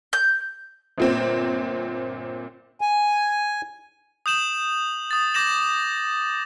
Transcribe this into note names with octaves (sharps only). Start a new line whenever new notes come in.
G6
G1 A#2 C4
G#5
D#6 G6 E7 F#7
D#6 A6
D6 G6 A#6 E7 F#7